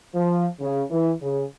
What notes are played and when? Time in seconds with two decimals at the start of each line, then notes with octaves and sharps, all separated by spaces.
0.15 F3
0.61 C#3
0.90 E3
1.21 C#3